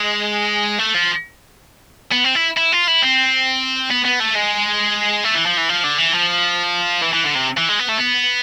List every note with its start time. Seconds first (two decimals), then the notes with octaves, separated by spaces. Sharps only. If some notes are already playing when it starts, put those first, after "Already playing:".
Already playing: G#3
0.79 A3
0.94 F3
2.12 B3
2.24 C4
2.35 E4
2.57 E4
2.72 F4
2.87 E4
3.02 C4
3.91 B3
4.05 B3
4.20 A3
4.36 G#3
5.24 A3
5.35 E3
5.46 F3
5.57 E3
5.69 F3
5.84 D3
5.98 E3
6.14 F3
7.02 E3
7.13 E3
7.24 D3
7.35 C3
7.58 E3
7.69 G#3
7.80 B3
7.89 A3
7.98 B3